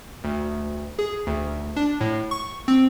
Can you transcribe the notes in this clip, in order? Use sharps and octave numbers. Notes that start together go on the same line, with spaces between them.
D2
G#4
D2
D4
A2
C#6
C4